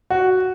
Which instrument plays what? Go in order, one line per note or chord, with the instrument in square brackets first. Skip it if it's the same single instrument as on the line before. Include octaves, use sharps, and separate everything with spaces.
[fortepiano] F#4